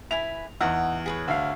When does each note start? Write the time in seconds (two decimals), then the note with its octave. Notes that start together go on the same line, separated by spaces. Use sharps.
0.11 E4 B4 G#5 F7
0.61 E2 D#4 F#5 C#6
1.06 G#4 B4 C#5
1.28 D2 F5